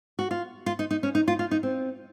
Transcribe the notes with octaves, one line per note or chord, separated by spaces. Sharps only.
F#4
F4
F4
D#4
D#4
C#4
D#4
F4
F4
D#4
C4